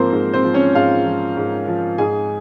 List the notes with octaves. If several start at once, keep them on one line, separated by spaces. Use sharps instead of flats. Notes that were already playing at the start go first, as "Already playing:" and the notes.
Already playing: G#2 F3 A#3 C4 A#4 C5
G#2
C4 C5
F3
C#4 C#5
G#2 F4 F5
F3
G#2
F3
G#2 G#4 G#5